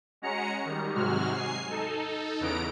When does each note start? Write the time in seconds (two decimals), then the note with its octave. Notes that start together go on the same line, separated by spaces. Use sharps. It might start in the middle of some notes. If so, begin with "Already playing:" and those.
0.22 G#3 C#4 F#4 A#5 C#7
0.65 D#3 G3
0.95 G#2 C3 F#3 G#3 F#4 F6
1.34 G#5 C7
1.69 D#4 A4
2.40 E2 C#3 E3 B3 A#5 D7